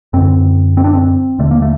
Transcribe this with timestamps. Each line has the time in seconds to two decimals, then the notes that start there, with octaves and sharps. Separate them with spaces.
0.13 F#2 D3 C4
0.77 C4
0.84 D4
0.93 C4
1.39 D#2 D3 A3
1.51 A#3
1.62 A3